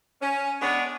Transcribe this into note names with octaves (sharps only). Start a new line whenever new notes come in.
C#4
G#3 B3 D4 C#5